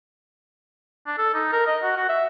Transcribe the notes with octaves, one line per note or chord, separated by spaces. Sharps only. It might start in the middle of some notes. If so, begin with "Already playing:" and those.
D4
A4
D#4
A#4
D#5
F#4
F#4
E5